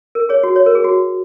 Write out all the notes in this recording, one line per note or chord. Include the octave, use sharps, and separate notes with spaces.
A#4
G#4 C#5
F#4
C#5
A#4
G#4
F#4